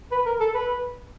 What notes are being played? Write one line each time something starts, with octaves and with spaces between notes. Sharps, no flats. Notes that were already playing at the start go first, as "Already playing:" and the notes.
B4
A#4
A4
B4